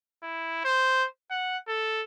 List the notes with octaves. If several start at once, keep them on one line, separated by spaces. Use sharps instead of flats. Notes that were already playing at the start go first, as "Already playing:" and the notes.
E4
C5
F#5
A4